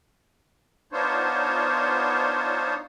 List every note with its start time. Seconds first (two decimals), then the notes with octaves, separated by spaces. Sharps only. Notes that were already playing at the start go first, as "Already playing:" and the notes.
0.92 B3 D4 D#4 F4 C5 C#5